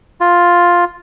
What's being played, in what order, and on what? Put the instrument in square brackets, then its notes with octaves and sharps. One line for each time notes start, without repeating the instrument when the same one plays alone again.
[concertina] F4